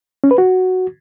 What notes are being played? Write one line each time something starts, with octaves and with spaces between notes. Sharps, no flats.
C#4
B4
F#4